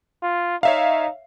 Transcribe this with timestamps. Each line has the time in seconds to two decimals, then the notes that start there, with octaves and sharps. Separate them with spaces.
0.23 F4
0.63 D#4 C#5 E5 F5